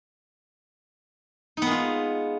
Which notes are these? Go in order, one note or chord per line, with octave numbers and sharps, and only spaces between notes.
G#3 B3 D#4 F4